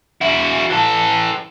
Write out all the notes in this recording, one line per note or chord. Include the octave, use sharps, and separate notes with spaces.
E4 F#4
E3 A4